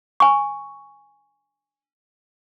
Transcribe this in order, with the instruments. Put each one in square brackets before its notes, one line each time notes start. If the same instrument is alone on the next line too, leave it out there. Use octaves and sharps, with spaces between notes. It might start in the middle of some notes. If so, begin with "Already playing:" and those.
[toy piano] G#5 C#6